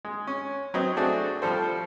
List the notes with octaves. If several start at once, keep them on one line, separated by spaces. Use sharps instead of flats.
G#3
C#4
F#3 B3 C4 D#5
A3 C4 D4 F#4 G#4
F3 G3 A4 C5